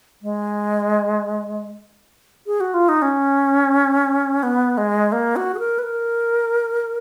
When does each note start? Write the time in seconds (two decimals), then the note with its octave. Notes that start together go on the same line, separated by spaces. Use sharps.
0.22 G#3
2.46 G#4
2.60 F#4
2.74 F4
2.89 D#4
3.02 C#4
4.43 B3
4.77 G#3
5.12 A#3
5.36 F#4
5.54 G#4
5.59 A#4
5.79 B4
5.83 A#4